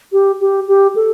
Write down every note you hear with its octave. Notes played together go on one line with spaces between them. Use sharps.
G4
G4
G4
A4